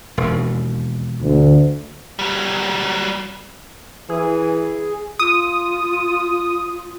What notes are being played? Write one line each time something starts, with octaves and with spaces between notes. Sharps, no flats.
E1 D#2
D2
F#3 G3
E3 G#4
F4 D#6